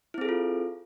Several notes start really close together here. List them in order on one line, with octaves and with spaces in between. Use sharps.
E4 C4 G#4 A4 F4